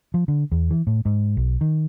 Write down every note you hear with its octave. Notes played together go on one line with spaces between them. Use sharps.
F3
D3
E2
E3
A2
G#2
B1
D#3